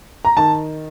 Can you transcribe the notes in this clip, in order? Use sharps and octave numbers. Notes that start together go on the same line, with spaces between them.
A#5
D#3 A5